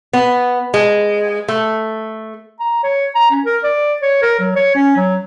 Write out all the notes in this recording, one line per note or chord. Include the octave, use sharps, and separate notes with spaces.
B3
G#3
A3
A#5
C#5
A#5
C#4
A#4
D5
C#5
A#4
F#3
C#5
C#4
F#3